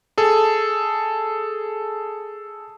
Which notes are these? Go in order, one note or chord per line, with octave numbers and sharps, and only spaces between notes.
G#4 A4